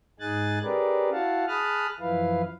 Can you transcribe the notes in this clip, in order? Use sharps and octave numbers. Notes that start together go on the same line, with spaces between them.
G#2 D#4 G#4 G#5 F#6 A6
C#4 G4 G#4 A#4 B4 D5
E4 F#4 F5 F#5 A5
G#4 A5 B5 D#6 F6 F#6
F#2 E3 F3 E4 B4 F5